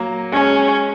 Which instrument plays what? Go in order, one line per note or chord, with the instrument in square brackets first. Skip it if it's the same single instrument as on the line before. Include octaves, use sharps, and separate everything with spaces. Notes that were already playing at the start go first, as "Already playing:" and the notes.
Already playing: [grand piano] F#3 A#3
[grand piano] G#3 [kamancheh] C#4